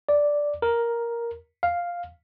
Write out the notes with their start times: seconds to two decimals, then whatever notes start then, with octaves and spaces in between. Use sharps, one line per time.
0.09 D5
0.62 A#4
1.63 F5